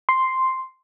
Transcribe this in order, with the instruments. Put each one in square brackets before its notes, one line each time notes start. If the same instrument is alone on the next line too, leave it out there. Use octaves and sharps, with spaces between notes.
[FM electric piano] C6